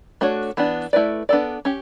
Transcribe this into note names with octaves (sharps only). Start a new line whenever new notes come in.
A3 D4 F#4 C#5
E3 B3 D4
A3 E4 B4 D5
B3 D4 A4 D5
C#4 G4